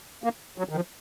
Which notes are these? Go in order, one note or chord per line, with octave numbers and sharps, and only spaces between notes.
A#3
F#3
D#3
F3